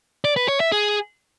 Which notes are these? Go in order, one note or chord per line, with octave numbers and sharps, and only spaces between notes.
D5
B4
C#5
E5
G#4